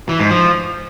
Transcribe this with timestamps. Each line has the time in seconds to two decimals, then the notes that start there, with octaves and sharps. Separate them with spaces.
0.09 E3
0.20 G#2
0.30 F3